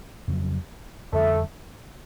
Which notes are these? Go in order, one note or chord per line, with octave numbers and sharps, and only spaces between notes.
F2 C#3 F#3
F2 D3 G3 A3